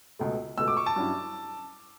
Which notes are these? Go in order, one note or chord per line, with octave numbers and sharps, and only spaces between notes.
C#2 B2 A3
C#2 B2 A3 E6
D6
C#6
A5
G2 F#3 C#4 E4